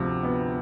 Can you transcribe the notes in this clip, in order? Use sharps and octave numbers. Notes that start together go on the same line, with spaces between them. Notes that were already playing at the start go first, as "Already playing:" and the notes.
Already playing: D2 C3 F3
B3